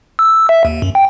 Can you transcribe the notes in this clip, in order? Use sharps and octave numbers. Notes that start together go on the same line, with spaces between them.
E6
E5
D#2
F#2
G5